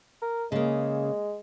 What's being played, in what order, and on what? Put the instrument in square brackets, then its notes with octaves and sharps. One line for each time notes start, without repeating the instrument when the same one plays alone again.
[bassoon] A#4
[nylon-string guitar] C#3 A#3 [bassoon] G#3